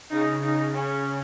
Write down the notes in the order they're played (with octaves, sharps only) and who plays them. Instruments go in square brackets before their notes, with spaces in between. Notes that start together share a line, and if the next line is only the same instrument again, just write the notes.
[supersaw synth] C#3 [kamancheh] D#4
[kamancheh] D#4
[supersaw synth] C#3 [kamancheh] C#4